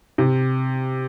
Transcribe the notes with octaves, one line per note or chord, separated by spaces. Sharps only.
C3